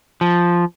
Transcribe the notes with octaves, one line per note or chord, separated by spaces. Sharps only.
F3